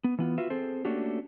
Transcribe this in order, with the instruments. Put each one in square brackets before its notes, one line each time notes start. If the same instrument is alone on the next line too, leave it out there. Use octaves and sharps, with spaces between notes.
[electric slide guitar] B3
E3 B3 F4
F4 F#4 B4 E5
C4 G#4 A4 C5
A3 A#3 C#4 D4 F#4 G4